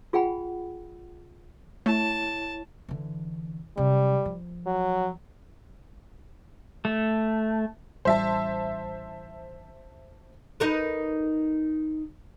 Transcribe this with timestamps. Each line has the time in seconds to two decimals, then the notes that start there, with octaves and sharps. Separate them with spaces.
0.13 F4 G#4 F#5 G5 B5
1.86 A3 E4 C#5 A5
2.89 D3 E3
3.77 C3 F#3 G3
4.25 F3
4.67 F#3
6.85 A3
8.05 A1 G3 C5 E5 A5
10.60 D#4 A#4 B4